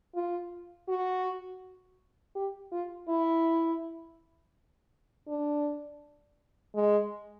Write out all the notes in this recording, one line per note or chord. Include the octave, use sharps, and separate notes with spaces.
F4
F#4
G4
F4
E4
D4
G#3